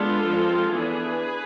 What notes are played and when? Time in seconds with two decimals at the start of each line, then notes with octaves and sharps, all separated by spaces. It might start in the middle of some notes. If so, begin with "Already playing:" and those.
Already playing: G#3 B3 D4 F4 A4
0.28 F3 G#3 C4
0.72 E3 B3 D4 G#4 B4